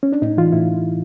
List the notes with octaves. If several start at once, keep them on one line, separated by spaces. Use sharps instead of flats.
C#4
D4
A2 D#4
E3 F4
A2 E4